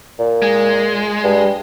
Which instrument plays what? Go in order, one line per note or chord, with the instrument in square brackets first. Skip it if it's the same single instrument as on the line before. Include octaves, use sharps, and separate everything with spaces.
[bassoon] A#2
[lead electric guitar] G#3
[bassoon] G2